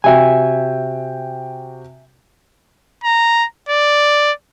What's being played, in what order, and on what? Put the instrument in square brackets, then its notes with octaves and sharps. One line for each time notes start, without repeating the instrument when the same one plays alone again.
[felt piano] C3 F#4 G5 [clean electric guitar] E5 G#5
[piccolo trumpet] A#5
D5